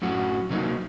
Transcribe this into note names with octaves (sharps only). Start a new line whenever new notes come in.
F#2 A2 F#3 F#4
C3 F#3 A#3 D#4